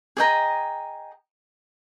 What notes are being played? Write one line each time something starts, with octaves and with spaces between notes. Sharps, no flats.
G#4 D#5 G5 A#5